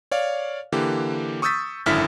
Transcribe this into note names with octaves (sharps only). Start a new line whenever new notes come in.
C#5 D5 F5
D3 E3 A#3 G4
C#6 D#6 E6 G6 A6 B6
G#1 F#2 D3 E4 F6 B6